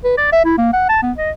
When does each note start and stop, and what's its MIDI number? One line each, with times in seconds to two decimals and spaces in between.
0.04 0.16 71
0.18 0.31 74
0.33 0.43 76
0.45 0.55 64
0.58 0.68 58
0.73 0.87 78
0.89 0.98 81
1.03 1.12 59
1.17 1.31 75